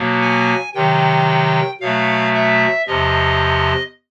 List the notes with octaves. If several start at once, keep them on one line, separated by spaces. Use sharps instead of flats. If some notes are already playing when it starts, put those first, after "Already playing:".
Already playing: B2 F#3 A#3
G#5
C3 D#3 F#3 G5
B2 F#3 A3 F5
E5
E2 C3 F3 D#5